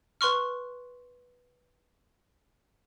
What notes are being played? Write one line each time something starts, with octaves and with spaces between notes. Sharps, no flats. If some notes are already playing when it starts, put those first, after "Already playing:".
B4 C6 C#6 F6